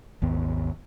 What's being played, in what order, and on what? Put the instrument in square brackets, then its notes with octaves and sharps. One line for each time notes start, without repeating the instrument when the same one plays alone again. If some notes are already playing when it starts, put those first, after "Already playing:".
[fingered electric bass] G#1 D#2 B3